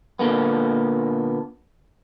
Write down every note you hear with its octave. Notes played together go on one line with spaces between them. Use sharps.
A#2 D3 A#3 B3